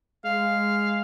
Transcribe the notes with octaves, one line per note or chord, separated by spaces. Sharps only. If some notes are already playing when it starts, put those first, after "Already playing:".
G#3 F5